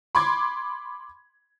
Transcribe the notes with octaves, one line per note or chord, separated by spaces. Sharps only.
B5 C6 D6 G#6